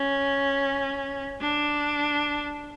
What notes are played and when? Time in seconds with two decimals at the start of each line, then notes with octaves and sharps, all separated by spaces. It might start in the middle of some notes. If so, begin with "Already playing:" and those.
Already playing: C#4
1.41 D4